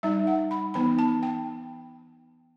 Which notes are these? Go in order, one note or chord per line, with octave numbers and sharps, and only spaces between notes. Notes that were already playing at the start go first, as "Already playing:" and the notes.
G3 D#4 E5
F#5
B5
E3 B3 D#4 B5
A5
G5